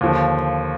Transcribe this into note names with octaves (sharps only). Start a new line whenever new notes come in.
D#2 D3 F3